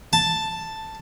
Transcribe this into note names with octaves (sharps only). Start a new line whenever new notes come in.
A5